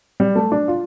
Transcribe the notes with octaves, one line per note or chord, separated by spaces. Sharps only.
G3
A3
D4
F4